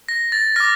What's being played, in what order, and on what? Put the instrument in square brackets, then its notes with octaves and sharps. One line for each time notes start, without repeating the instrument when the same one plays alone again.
[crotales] A#6
A6
D6 F6 A#6